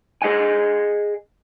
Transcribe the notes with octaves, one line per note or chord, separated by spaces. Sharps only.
G#4 D#5 F#5 G#5